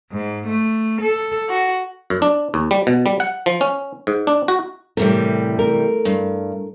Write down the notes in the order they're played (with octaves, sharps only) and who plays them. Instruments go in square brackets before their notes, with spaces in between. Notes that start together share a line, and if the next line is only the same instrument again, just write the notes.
[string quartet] G#2
A3
A4
F#4
[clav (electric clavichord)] F#2
D4
D#2
G3
B2
G3
F#5
F3
C#4
G#2
D4
F#4
[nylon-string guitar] A2 A#4 [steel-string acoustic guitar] C3 E3 G3
[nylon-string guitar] A3 A#4
[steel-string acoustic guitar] G2